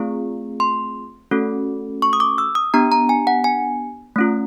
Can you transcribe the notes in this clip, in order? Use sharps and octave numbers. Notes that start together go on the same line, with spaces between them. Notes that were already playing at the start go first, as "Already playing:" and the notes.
Already playing: A3 C4 F4 G#4
C6
A3 C#4 F#4 A4
C#6
D#6
D6
E6
D#6
B3 D4 G4 A#5
A#5
G#5
F#5
G#5
A3 C#4 F4